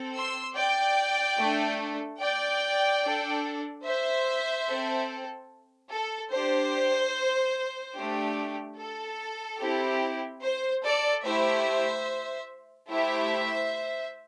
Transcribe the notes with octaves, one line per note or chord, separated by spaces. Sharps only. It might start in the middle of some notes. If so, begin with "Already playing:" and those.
Already playing: C4 A4
C6 E6
D5 G5
A3 D4 A4
D5 G5
D4 A4
C5 E5
C4 A4
A4
D4 G4 C5
A3 D4 G4
A4
C4 E4 G4
C5
A4 D5
A3 E4 G4 C5 E5
A3 E4 G4 C5 E5